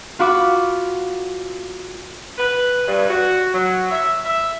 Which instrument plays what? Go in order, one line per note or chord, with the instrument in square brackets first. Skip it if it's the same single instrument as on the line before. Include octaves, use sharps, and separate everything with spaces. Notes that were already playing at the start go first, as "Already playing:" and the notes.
[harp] F4 F#4 B5 D6
[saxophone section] B4
G2
F#4
F#3
E5
E5